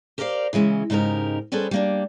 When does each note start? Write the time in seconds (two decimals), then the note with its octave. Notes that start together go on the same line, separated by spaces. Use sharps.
0.18 G4 A#4 C5 D5 D#5 F5
0.53 C#3 E3 G#3 C#4
0.90 G#2 C#3 D#4 G4 A#4
1.52 G3 C#4 G#4 A4 B4 C5
1.71 G3 A#3 D4